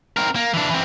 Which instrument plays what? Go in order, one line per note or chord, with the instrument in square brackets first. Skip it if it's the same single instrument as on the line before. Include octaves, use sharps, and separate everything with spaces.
[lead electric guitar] C4 A#4
A#3
E3 D4
E3 C4